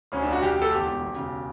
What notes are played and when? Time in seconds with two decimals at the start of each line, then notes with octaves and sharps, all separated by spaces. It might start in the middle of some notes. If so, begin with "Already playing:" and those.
0.12 D2 C#4
0.22 D4
0.27 D2
0.33 F#4
0.41 D2 G4
0.52 G4
0.56 D2
0.62 A4
0.72 E2 G4
0.87 E1
1.02 E1
1.16 C#3